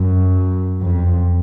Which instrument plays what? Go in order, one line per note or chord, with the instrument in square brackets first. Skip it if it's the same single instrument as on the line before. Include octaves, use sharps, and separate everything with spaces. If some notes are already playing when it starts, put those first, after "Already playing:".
Already playing: [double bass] F#2
F2